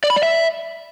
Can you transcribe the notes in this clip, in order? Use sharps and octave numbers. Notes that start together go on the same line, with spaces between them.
D5
B5
D5
E5